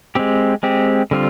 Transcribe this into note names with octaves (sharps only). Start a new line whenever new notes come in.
G#3 C4 G4
G#3 C4 G4
D3 G3 C4 F4